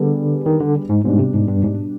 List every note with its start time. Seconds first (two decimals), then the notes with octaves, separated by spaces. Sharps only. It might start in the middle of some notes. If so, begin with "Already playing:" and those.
Already playing: D3 G3 B3 D4 G#4
0.46 D#3
0.60 D3
0.89 G#2
1.04 G#2 B2 G3 D4
1.19 C3
1.34 G#2
1.48 G2
1.63 G#2